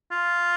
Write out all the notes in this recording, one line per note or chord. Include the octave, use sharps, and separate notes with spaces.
F4